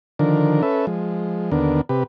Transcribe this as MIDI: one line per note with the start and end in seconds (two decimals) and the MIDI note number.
0.19 0.62 50
0.19 0.62 51
0.19 0.62 53
0.19 0.62 62
0.19 0.62 70
0.62 0.86 61
0.62 0.86 69
0.62 0.86 71
0.62 0.86 76
0.87 1.51 53
0.87 1.51 56
1.51 1.81 39
1.51 1.81 50
1.51 1.81 59
1.51 1.81 62
1.51 1.81 70
1.89 2.03 48
1.89 2.03 67
1.89 2.03 71